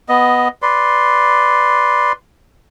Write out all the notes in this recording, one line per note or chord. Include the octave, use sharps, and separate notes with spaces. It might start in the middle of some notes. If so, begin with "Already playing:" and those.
B3 D#5
B4 D5 C6